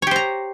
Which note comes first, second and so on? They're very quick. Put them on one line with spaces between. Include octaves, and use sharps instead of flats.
C#5 G4 C5 A#5